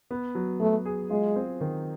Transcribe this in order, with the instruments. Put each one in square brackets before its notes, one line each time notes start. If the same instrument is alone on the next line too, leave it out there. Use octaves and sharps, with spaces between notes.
[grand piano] B3
F#3
[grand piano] F#3 [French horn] A3
[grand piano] G#4
[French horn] G#3 [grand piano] F4
[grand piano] C4
D#3